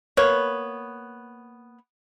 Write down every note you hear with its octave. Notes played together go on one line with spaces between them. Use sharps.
A#3 B3 C#5